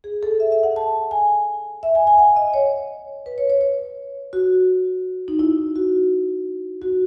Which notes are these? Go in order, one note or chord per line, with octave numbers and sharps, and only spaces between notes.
G#4
A4
E5
E5
F#5
A5
G#5
E5
G#5
G#5
F#5
D#5
C#5
B4
C#5
C#5
C#5
F#4
D#4
E4
F#4
F#4